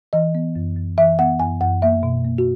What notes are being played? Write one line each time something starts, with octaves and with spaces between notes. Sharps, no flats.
E3 D#5
B3
F#2
F#2
E3 E5
B3 F#5
F#2 G#5
F#2 F#5
A#3 E5
B2
A#3
F#4